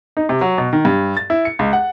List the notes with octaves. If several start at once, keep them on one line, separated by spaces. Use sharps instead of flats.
D#4
C3
F#3
B2
D#3
G2
A6
E4
C#7
C#2
F#5